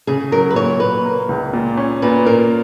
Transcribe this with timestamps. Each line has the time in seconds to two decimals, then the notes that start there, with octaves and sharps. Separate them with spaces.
0.07 C#3 G#4
0.31 F#3 A#4
0.51 B4
0.56 A#2 C#5
0.80 A#2 B4
1.05 A#3
1.29 C#2
1.53 A#2
1.77 C#4
2.02 A#2 B4
2.26 A#3 A#4